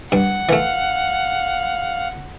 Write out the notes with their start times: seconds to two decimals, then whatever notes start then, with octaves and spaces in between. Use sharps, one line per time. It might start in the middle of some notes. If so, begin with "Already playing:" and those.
0.12 G2 F#5
0.49 E3 A3 F5